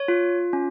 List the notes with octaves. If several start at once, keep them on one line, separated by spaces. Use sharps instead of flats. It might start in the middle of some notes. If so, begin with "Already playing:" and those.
Already playing: C#5
F4
C#4